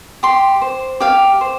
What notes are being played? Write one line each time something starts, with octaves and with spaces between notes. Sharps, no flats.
G4 C6
C5
G4 F5
C5